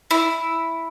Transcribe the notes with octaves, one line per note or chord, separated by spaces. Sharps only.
E4